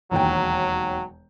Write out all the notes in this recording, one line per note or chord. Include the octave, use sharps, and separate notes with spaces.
E1 D#2 F#3 G5